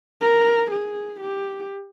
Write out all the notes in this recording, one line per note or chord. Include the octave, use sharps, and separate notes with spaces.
A#4
G#4
G4